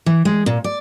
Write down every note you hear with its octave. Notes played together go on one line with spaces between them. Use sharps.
E3
G#3
A#2
D5